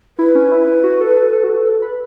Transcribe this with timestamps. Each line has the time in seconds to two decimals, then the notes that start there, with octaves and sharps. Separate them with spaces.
0.18 E4 B4
0.35 C#4
0.51 E4
0.67 E4
0.84 F#4
1.00 A4
1.16 A4
1.33 A4
1.44 F#4
1.49 A4
1.66 A4
1.82 B4